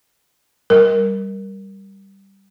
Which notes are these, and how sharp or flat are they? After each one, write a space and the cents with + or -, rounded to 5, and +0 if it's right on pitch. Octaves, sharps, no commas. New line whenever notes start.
G3 +0 A#4 +0